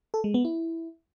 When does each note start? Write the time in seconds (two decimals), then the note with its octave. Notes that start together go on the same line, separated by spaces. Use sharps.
0.14 A4
0.24 G#3
0.34 B3
0.45 E4